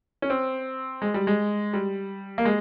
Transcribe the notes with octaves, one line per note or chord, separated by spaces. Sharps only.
C#4
C4
G#3
G3
G#3
G3
A#3
G#3